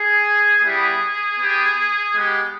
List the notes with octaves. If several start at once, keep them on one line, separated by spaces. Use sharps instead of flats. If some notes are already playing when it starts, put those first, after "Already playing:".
Already playing: G#4
G3 B3 E4 G4 G#4
B3 G4
G#3 B3 G4